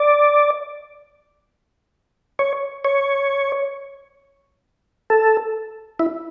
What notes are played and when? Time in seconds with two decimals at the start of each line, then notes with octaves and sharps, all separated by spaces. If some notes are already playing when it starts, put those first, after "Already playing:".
Already playing: D5
2.39 C#5
2.85 C#5
5.10 A4
6.00 E4